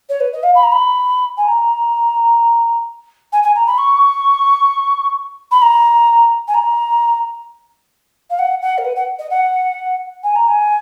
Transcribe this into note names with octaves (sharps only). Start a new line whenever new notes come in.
C#5
B4
D#5
F5
B5
A#5
B5
G#5
A#5
G#5
G#5
A#5
B5
C#6
B5
A#5
G#5
A#5
F5
F#5
F#5
A#4
B4
F#5
D#5
F#5
G#5
A#5
G#5